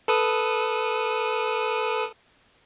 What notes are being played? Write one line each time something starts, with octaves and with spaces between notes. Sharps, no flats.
A4 B4 D#6